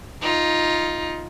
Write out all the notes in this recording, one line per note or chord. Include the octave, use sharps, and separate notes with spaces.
D#4 F4